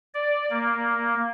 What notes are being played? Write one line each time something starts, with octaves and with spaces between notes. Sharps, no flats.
D5
A#3